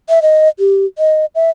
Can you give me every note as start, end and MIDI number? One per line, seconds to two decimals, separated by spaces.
0.09 0.22 76
0.22 0.48 75
0.59 0.85 67
0.98 1.26 75
1.35 1.50 76